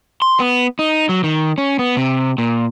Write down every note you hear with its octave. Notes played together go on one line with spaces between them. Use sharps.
C6
B3
D#4
F#3
D#3
C#4
B3
C3
A#2